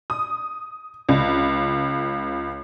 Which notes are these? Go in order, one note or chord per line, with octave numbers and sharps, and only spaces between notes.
D#6
C#2